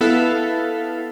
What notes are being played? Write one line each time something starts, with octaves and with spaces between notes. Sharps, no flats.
B3 E4 A4 E5 F5